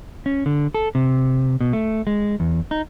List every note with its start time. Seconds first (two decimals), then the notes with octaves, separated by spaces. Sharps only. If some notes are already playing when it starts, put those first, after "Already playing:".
0.26 C#4
0.46 D3
0.74 A4
0.95 C3
1.61 B2
1.73 A3
2.07 G#3
2.40 E2
2.71 D#4